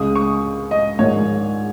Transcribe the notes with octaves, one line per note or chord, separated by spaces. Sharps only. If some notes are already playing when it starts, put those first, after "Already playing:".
Already playing: C#2 C#3 G#3 C#4 D#6
C#6
D#5
A#1 G#2 D#3 C#5